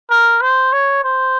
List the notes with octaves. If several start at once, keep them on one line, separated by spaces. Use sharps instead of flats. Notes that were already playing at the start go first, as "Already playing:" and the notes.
A#4
C5
C#5
C5